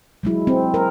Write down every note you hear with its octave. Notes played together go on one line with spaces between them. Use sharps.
F#3 G#3 E4
C4
A#4